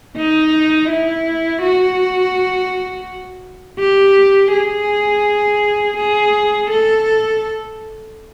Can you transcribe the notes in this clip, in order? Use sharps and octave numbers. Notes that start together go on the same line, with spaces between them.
D#4
E4
F#4
G4
G#4
G#4
A4